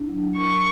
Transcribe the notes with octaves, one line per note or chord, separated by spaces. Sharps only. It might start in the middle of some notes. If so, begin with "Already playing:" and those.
Already playing: D4 E4
F#3
A#4 C#6